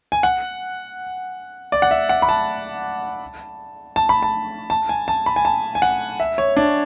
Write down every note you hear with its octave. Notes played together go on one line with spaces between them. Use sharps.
G#5
F#5
D5
F#5
E5
F#5
B5
A5
A5
B5
A5
A5
G#5
A5
B5
G#5
A5
G#5
F#5
E5
C#5
D4